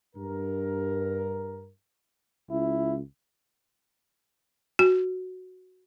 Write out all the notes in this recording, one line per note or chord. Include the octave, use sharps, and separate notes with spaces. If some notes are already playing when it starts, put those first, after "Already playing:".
G2 A#4
C#2 E4
F#4